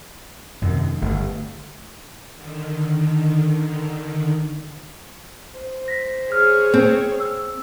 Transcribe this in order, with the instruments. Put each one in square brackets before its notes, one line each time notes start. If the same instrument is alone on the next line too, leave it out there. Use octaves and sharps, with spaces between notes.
[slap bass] F#2 C3 D#3
G1 A3
[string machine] D3 D#3
[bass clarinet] C5
[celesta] A#6 B6
[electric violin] G#4 C#5 [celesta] F6
[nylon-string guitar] C4
[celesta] E6